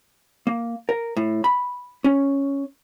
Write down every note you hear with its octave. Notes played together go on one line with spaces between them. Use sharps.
A#3
A#4
A2
B5
C#4